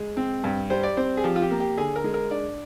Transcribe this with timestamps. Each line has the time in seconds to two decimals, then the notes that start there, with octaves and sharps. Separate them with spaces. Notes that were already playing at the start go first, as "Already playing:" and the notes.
Already playing: G#3
0.17 C4
0.44 G2
0.70 G3 C5
0.83 D5
0.97 C4 C5
1.17 G#4
1.24 F3 G4
1.36 F4
1.42 G4
1.51 A#3
1.60 G4
1.77 D3 G#4
1.96 A#4
2.04 G#3
2.14 A#4
2.31 D4 D5